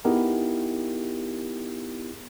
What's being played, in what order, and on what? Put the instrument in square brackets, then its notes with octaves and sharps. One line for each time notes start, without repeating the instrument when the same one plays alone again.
[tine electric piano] B3 D#4 E4 G4 G#4 A#4